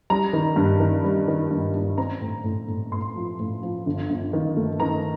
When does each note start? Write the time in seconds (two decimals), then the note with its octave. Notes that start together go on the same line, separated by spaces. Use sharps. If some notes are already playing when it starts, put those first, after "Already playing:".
0.10 G3 A#5
0.33 D#3
0.56 G2
0.80 D#3
1.04 G3
1.28 D#3
1.51 G2
1.74 G2
1.98 C4 A#5
2.21 A2
2.44 A2
2.68 A2
2.91 A2 C6
3.16 F3
3.40 A2
3.63 F3
3.86 G1
4.10 G1
4.33 D#3
4.57 A3
4.80 D#3 A#5